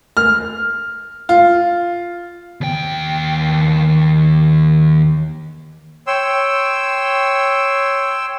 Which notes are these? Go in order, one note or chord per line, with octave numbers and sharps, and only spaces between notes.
F6
F4
D#2 G5
C#5 G5 C6 E6